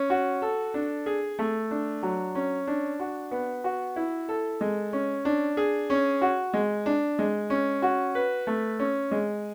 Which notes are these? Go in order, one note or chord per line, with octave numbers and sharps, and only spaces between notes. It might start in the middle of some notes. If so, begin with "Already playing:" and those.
Already playing: C#4
F#4
A4
D4
G#4
A3
D4
F#3
C#4
D4
F#4
B3
F#4
E4
A4
G#3
C#4
D4
G#4
C#4
F#4
G#3
D4
G#3
C#4
F#4
B4
A3
C#4
G#3